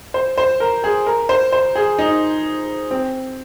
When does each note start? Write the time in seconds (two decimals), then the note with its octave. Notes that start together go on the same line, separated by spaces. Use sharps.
0.14 C5
0.38 C5
0.60 A#4
0.84 G#4
1.06 A#4
1.29 C5
1.52 C5
1.75 G#4
1.99 D#4
2.91 C4